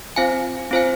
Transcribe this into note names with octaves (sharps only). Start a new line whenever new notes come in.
C4 F4 C5 F5 G#5
C4 F4 C5 F5 G#5